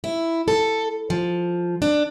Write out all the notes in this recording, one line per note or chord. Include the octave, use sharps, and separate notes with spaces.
E4
A4
F3
D4